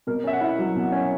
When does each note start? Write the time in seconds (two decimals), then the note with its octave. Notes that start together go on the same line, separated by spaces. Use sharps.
0.07 B2 A#4
0.24 C#4 E5
0.33 F#5
0.41 E4
0.59 F#3
0.76 B2
0.92 C#4